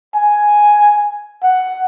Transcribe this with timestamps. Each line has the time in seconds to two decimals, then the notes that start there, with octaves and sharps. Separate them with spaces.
0.15 G#5
1.43 F#5